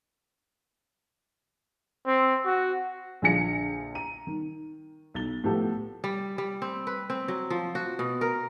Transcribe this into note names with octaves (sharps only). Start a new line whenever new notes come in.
C4
F#4
A#1 D3 F3 G#5 A#6 C#7
A#5 D#7
D#3
B1 A6 G7
A2 F3 B3 G4 A4
G3
G3
C4
B4
C4
F#3
F3
F#4
B2
A#4